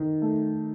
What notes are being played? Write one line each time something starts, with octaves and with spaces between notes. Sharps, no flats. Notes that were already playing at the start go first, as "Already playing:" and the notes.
Already playing: D#3
A3